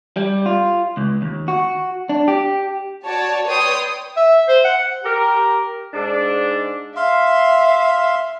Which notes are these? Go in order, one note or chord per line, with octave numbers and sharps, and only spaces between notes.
G3
F4
C#2
D#2
F#4
D4
G4
F#4 C#5 D5 A5
B4 C#5 D5 G5 C6 D#6
E5
C5
F#5
G4 A#4
G#2 D4
E5 F5 C6